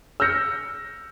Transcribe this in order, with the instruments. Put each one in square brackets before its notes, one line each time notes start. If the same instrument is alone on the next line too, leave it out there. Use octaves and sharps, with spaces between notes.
[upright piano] E6 F6 G6 A#6 C#7